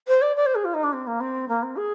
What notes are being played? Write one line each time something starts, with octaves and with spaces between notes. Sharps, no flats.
C5
D5
D5
C5
G#4
F4
D#4
D4
C4
A#3
C4
A#3
C4
G#4